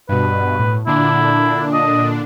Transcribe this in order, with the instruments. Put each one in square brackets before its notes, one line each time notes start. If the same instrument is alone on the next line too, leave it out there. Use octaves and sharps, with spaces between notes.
[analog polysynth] G2 B2 [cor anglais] B4
[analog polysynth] A2
[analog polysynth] A#2 D3 D4 [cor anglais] E4
[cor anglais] D#5